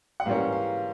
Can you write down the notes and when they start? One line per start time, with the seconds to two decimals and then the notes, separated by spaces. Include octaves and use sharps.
0.20 F#5
0.26 G#2 E3 G3 A#3 C#4 F5
0.52 F5